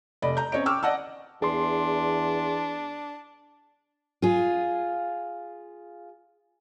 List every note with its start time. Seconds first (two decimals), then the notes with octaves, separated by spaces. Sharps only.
0.22 F1 D5 D#5 B5
0.37 A#5 G6
0.52 C4 C#4 C#5 D#5 D7
0.66 G5 C#6 D6 E6 F6
0.83 D5 D#5 F#5 A5 E6
1.42 E2 D4 G#4 C6
4.22 F4 G#4